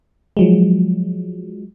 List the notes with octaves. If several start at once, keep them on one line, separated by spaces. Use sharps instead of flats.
F3 F#3 G#3